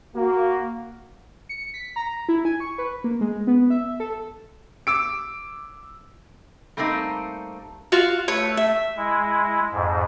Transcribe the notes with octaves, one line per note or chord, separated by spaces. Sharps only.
A#3 F#4
C#7
B6
A#5
E4
G#5
C#6
B4
A#3
G#3
B3
E5
A4
D6 E6 D7
G3 A3 A#3 C4 D#4
F4 F#4 F5
A3 B4 C#5
E5
G#3 E4
F2 G#2